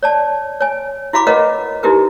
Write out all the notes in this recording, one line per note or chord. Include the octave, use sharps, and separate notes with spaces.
C#5 D5 A5
C#5 G#5
E4 F#4 F5 B5 D6
A#4 B4 C#5 D#5 F5 F#5
D#4 E4 F#4 G4 A#4 B4